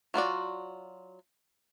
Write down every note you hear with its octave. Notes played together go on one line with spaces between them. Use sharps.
F#3 F4 F#4 D5